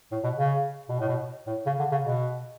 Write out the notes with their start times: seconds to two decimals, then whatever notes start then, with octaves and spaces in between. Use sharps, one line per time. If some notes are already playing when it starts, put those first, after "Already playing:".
0.12 A2
0.24 B2
0.37 C#3
0.89 B2
1.00 A2
1.08 B2
1.47 A2
1.66 C#3
1.79 D3
1.91 C#3
2.05 B2